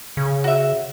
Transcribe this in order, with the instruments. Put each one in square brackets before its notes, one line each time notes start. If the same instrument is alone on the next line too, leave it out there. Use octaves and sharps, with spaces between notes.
[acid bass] C#3
[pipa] F#4 E5